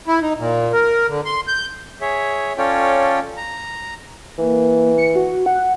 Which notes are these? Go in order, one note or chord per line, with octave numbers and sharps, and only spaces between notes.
E4
D#4
A#2
A#4
D3
C6
G6
G#4 C#5 E5
C#4 F4 A4 C#5 D5 G5
A#5
E3 A#3
C#7
F#4
F#5